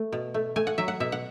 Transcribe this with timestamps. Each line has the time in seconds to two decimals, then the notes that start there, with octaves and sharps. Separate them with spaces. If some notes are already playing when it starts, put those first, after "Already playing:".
Already playing: A3
0.12 B2
0.34 A3
0.56 A3 G#5
0.67 F#5
0.78 F#3 E5
0.88 F#5
1.00 B2 E5
1.12 F#5